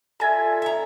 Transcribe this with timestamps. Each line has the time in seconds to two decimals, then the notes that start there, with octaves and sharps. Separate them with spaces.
0.20 F4 A4 E5 G#5 G#6
0.62 E5 A#5